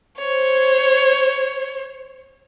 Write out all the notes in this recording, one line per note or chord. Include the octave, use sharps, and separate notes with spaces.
C5 C#5